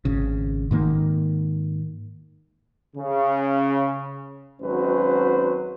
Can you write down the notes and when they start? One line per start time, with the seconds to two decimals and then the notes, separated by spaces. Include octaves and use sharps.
0.05 G#1 C#3
0.71 G#2 D#3 A#3
2.96 C#3
4.61 G#1 F#3 C#4 F#4 B4 C5